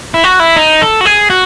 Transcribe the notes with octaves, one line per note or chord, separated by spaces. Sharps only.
E4
F#4
E4
D#4
A4
F#4
G#4
F#4